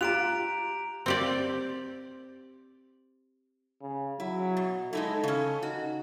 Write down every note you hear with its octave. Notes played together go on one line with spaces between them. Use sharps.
F4 G4 A#5 F#6 D7 F7
C4 G4 D5
C#3
F#3 E4
B2
G#3 D#4 E4 A4
C#3 C#4
D#4 F#4